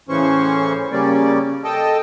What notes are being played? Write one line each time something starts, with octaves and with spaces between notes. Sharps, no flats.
A2 C#3 E3 C#4 C5 C#6
C#3 G3 A#3 C#4 D5
A4 D#5 G5 A5